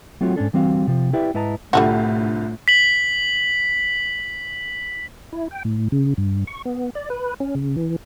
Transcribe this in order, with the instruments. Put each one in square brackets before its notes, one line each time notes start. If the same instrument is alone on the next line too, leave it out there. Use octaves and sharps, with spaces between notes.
[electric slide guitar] F#3 A3 C4 F4 F#4 C#5
G#2 C#4 D4 A4
D3 E3 G3 C4 F#4 F5
C3 F3
E4 G4 B4 D5 E5
G#2 E4 B4 D#5 A5 A#5
[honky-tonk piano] C2 D3 F4 [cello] A2 [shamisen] G3 A3 F#4
[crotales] B6 F#7
[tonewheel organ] E4
G5
A2
C#3
G2
C#6
B3
D5
B4
C#4
C#3
E3